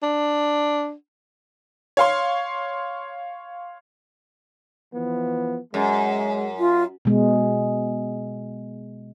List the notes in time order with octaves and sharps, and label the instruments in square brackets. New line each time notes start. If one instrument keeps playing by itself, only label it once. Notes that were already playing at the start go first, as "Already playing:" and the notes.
[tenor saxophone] D4
[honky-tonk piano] C#5 F5 C6
[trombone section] E3 F3 B3
[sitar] F#2 [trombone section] G#3
[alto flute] F4
[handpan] B2 G#3